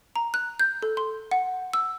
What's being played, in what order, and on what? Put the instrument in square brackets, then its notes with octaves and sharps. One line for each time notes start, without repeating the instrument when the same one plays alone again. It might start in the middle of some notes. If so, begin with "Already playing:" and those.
[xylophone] A#5
F#6
G6
A4
C6
F#5
E6